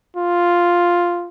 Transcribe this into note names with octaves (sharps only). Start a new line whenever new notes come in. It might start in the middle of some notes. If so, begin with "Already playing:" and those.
F4